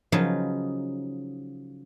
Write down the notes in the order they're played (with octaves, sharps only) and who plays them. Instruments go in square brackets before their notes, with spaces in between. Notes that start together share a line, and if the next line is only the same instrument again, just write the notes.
[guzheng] C#3 F3 F#3 D#4 B4